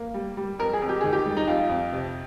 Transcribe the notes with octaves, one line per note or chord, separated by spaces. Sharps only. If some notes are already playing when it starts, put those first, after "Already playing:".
Already playing: A#3
G3
G3
F2 A#4
G#4
F2
G4
D#3 G#4
G4
G3
D#4
F2 F4
F2
C3